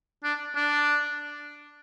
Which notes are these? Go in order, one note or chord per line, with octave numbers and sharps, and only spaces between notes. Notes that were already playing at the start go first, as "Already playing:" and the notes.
D4
D4